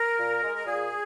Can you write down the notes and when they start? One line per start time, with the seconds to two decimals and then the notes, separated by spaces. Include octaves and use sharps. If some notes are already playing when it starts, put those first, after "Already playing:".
Already playing: A#4
0.18 A#2
0.41 G#3
0.55 A#4
0.66 A#2 G#4